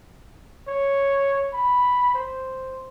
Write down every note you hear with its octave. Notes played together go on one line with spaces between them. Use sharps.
C#5
B5
C5